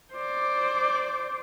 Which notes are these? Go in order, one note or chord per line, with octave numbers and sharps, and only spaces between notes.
C5 D5